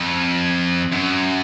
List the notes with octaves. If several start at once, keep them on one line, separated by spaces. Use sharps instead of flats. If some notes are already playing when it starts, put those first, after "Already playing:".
Already playing: F2
F#2